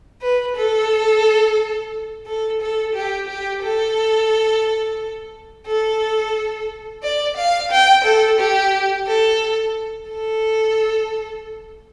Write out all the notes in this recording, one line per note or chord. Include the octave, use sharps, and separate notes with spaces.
B4
A4
A4
A4
G4
G4
A4
A4
D5
F5
G5
A4
G4
A4
A4